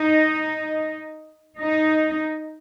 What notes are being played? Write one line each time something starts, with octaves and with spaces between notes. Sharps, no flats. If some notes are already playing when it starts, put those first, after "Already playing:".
Already playing: D#4
D#4